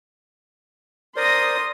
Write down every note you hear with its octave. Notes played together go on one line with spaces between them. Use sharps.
A#4 C5 D5 C6 D#6 A#6